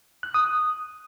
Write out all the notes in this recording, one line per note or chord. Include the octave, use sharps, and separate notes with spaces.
F#6
D#6
D#6